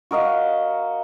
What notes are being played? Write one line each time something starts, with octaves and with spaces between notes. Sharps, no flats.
F#4 A#4 D#5 F5